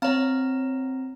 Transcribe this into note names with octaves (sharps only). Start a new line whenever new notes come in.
C4 C#5 F5 A#5